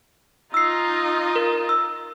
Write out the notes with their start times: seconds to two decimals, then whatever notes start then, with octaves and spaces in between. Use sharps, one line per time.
0.54 D#4 F4 E6 C7
1.36 A#4
1.69 E6